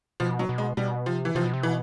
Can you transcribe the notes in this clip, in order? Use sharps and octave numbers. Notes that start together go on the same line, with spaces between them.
B2 F3
F#3
B2
G#3
B2 G3
C3 F3
E3
C3 F3
B2
C3
B2 E3